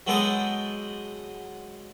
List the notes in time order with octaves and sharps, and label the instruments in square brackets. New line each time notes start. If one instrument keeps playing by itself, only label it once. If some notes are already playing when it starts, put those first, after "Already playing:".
[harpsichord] F#3 G#3 B3 A4 G5 D#6